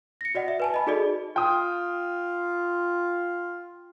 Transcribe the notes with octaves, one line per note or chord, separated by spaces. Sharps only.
A#6 C#7
F#4 D5 D#5 F#5
E5
B4 G#5 A5
D#5 B5
D#4 F#4 G#4 A4 D5 D#5
F4 G5 D#6